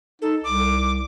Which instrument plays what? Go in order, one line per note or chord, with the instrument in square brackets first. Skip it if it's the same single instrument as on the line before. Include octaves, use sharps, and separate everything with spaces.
[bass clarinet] D#4 [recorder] A4
[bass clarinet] C2 [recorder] D6